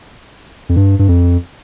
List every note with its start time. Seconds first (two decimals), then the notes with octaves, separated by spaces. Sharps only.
0.69 F2
0.76 G2
0.99 G2
1.08 F2